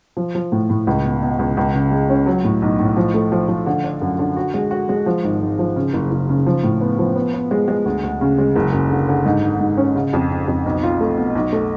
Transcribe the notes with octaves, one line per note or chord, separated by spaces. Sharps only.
F3
F3
A2
A2
C#2
B2
B2
C#2
C#2
C#3
G#3
C#4
F#3
A2
B1
A2
F3
A3
F3
F3
D3
D4
F#2
D3
F#4
G#3
F#4
G#3
F3
G#1
G#1
F3
C#3
F#1
F#1
C#3
F3
A2
B3
F3
B3
B3
G#3
G#3
D2
D2
C#3
G#3
F#1
F#2
D3
D3
G#2
G#1
G#2
C#4
C#3
F2
C#3
F2
B1
F4
A3
B2
B1
A3